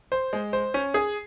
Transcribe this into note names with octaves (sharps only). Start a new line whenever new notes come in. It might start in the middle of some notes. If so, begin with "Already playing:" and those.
C5
G#3
C5
C#4
G#4